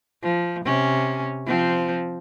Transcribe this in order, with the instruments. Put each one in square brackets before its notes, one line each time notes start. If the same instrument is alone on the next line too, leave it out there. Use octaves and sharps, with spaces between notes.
[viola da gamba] F3
C3 C#4
F3 C4